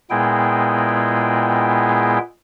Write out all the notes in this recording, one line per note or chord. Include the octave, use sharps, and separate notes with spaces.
A#2 G#3 B3 E4 G#4 G5